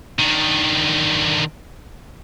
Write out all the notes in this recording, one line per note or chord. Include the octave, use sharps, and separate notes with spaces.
D3 D#3